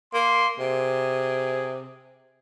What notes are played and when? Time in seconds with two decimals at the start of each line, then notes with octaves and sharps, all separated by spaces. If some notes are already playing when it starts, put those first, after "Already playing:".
0.14 A#3 C6
0.59 C3 G#4